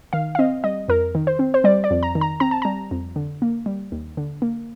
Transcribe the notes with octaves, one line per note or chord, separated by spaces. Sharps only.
D#3 F5
F5
C4 D#5
G3 D#5
F2 A#4
D#3
C5
C4
C5
G3 D5
D5
F2
A#5
D#3
A#5
C4 A#5
A5
G3 A#5
F2
D3
A#3
G3
D#2
D3
A#3